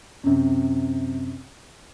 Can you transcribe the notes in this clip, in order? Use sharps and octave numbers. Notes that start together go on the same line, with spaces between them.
F#2 C3